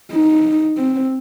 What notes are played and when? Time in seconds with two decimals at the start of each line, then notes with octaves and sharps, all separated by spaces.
0.12 D#4
0.78 C4